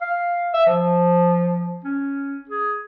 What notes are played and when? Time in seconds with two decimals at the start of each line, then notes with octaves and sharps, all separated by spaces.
0.01 F5
0.54 E5
0.66 F3
1.84 C#4
2.49 G#4